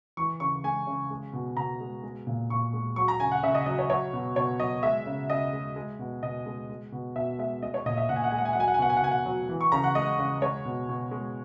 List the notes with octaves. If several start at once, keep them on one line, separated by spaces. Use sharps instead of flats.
E3 C#6
C#3 C#6
G#3 G#5
C#3
G#3
B2
B2 A#5
G#3
G#3
A#2
A#2 C#6
G#3
F#3 C#6
A#5
C#3 G#5
F#5
C#3 E5
D#5
F#3 D#5
C#5
F#3 C#5
B2
B2 C#5
F#3 D#5
G#3 E5
C#3
C#3 D#5
G#3
G#3
B2
B2 D#5
G#3
G#3
B2
B2 E5
G#3 E5
G#3 D#5
C#5
A#2 D#5
E5
A#2 F#5
G#5
F#5
G#3 G#5
F#5
G#5
F#5
F#3 G#5
F#5
G#5
B2 F#5
G#5
F#5
B2 G#5
F#5
F#3
E3
C#6
C#3 A#5
F#5
G#3 D#5
C#3
G#3 C#5
B2
B2
G#3